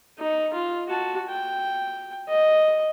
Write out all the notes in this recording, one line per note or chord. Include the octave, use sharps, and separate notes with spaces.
D#4
F4
F#4 A5
G5
D#5